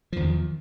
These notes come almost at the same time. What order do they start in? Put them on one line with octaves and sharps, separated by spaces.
F3 E2 D#3